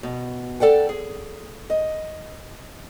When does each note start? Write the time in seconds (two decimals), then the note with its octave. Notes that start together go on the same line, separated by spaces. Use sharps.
0.03 B2
0.60 A4 D5 F#5 G5
0.89 G#4
1.70 D#5